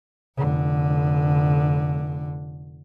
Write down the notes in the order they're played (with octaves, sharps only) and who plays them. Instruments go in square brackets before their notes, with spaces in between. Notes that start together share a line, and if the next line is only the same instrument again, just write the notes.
[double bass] F1 D3